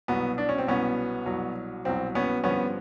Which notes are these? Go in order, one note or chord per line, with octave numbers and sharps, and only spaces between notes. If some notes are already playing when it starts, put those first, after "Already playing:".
C2 B2 F#3 B3
D4
C#4
C4
C2 B2 F#3 B3 C#4
C2 B2 F#3
C2 B2 F#3 C4
B3 C#4
G2 D3 F3 B3 C#4